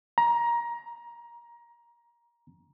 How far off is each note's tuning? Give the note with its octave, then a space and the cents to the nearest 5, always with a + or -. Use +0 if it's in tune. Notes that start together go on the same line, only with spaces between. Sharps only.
A#5 +20